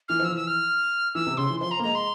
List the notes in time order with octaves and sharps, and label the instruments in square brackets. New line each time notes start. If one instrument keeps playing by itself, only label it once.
[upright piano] E3 [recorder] F6
[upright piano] F3
[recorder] E6
[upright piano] E3
[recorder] E6
F6
[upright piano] E3 [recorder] E6
[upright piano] C3
[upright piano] C#3 [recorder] C6
[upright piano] E3
[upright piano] F3 [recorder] C6
[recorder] A#5
[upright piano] A#3
[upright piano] G#3 [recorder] A#5
[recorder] C6